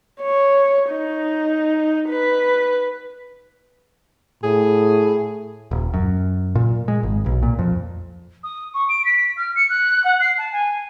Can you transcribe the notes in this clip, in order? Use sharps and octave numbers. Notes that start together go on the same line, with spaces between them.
C#5
D#4
B4
A2 G#4
D#1
F#2
A#2
G#3
G#1
B1
A#2
F2
D#6
C#6
D7
B6
F6
C#7
F#6
F#5
C7
A5
G#5